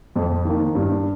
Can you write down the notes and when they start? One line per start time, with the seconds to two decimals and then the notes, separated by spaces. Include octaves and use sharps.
0.16 F2
0.45 D#3 A#3
0.75 G2